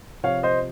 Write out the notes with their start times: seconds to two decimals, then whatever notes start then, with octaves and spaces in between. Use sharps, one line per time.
0.23 C3 F3 C#5 F5
0.43 C5 D#5